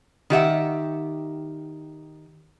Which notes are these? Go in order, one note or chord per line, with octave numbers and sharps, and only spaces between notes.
D#3 G4 E5 F#5